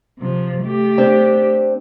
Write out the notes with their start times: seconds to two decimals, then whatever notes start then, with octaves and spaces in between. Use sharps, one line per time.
0.19 C3 F3
0.62 A3 G4
0.97 C4 D4